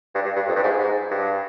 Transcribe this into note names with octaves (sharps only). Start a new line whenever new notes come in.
G2
G2
G2
F2
G2
G#2
G#2
G2